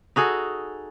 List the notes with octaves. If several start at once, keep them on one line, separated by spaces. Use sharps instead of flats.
D#4 F#4 G#4 A4